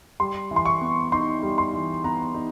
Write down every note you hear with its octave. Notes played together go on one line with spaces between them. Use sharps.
G3 C6
E3
C6
C#6
B3
D#4 C6
G3
C6
E3
B3 A#5
D#4